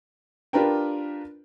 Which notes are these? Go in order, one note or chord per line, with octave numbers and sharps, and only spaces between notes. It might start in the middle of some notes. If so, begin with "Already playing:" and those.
D4 F4 G4 A#4 B4 G5